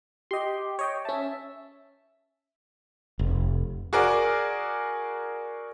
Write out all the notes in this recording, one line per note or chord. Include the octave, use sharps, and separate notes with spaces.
G4 D#5 C6
C#5 D#5 G5
C#4 E5 A5
F1
F#4 G#4 A#4 D5